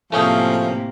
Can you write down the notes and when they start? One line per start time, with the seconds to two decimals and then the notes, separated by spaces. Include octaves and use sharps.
0.12 A2 C3 F3 A3 A#3 C#4 G#4